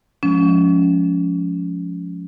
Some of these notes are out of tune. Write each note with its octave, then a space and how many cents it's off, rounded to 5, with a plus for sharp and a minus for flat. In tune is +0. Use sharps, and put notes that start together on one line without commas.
F3 +20 G#3 +20 C#4 +25